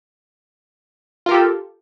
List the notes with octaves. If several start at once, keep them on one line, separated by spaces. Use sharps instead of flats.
F4 G4 A4 A#4